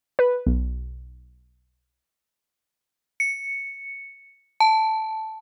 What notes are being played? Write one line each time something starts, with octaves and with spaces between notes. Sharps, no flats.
B4
B1
C#7
A5